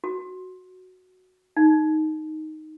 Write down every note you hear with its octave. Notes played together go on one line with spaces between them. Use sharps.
F#4
D#4